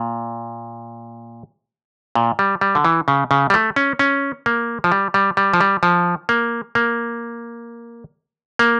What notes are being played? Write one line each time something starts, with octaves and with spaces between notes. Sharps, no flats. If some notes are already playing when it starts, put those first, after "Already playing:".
Already playing: A#2
A#2
G3
G3
D3
E3
C#3
C#3
G3
A3
C#4
C#4
A#3
F3
G3
G3
G3
F3
G3
F3
A#3
A#3
A#3